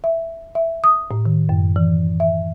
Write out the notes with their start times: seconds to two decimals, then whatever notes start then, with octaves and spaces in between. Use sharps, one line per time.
0.04 E5
0.55 E5
0.84 D#6
1.11 A2
1.26 D#3
1.49 F#2
1.76 E3
2.20 E5